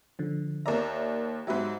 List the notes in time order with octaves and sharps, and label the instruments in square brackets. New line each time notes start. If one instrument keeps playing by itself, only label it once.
[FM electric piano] D3 F3
[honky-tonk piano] D#2 A#5 [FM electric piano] A#4 D5 E5
[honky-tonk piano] G#2 F#3 [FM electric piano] G4 E5 B5